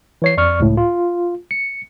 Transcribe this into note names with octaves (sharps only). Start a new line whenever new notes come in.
E3 C#5 C7
F2 D5 C#6 F6
C#2 A2
F4
C#7